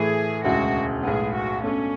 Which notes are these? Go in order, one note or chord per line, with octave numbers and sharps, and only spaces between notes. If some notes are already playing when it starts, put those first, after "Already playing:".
Already playing: A2 E3 A3 E4 G#4
E1 D2 C#3 G#3 F#4
B1 A2 G#3 B3 G#4
F#4
B2 A3 C#4 D4 A4